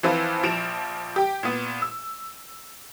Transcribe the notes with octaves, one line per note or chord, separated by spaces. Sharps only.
E3 F3 C4 F4 B4
A#1 F3 D7 E7 F7
G4 G5
A#2 B3
E6